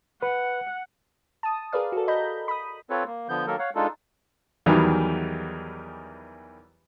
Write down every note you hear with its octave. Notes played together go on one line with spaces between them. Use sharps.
B4 F#5
A5 D#6
G#4 A#4 B4 D5 F5
F#4 A4
D#5 A#5 B5 G6
B5 D#6
C4 F4 A4 B4 C#5
A#3
D3 F3 B3 G6
D#3 F#3 A#3 A4 A#4
C#5 F5 F#5
G#3 D4 D#4 F4 A4
E2 D#3 E3 F#3 G3